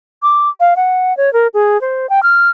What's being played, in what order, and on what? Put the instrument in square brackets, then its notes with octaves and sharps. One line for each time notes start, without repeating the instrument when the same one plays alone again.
[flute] D6
F5
F#5
C#5
A#4
G#4
C5
G5
F6